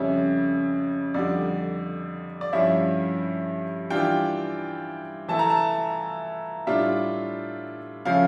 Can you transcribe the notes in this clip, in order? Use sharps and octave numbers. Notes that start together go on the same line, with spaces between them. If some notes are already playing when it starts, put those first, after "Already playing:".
Already playing: F2 C#3 G3 C#4 E5
F2 D3 G3 D5
D5
G2 F3 C#4 E4 E5
E3 G3 D4 F4 G5
E3 A3 E4 A5
A#5
A5
A2 G3 D4 F4 E5
C#3 F3 A3 C#4 F5